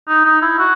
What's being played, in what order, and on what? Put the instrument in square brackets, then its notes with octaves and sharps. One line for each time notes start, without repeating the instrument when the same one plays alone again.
[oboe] D#4
D#4
E4
F#4